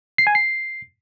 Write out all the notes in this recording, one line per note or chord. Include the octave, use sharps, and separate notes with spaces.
C7
G#5
C7